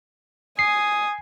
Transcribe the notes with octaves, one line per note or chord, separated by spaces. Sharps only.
G#5 D#6 C7